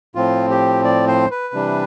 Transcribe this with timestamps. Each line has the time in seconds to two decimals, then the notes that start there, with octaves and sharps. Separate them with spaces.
0.15 A2 F3 C4 F4
0.50 G4
0.84 D5
1.08 C5
1.31 B4
1.54 C3 E3 G3 D4